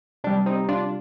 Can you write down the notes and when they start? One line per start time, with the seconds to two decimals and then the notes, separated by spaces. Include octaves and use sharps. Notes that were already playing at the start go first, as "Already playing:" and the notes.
0.24 C3 G3 D4
0.46 C4 D#4
0.69 D4 F4